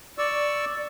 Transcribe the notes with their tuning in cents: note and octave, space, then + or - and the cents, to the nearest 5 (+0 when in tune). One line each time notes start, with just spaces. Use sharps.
D5 +0 C#6 +0 E6 +0